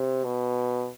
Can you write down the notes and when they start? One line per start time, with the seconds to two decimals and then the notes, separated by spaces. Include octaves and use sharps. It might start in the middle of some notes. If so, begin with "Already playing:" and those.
Already playing: C3
0.24 B2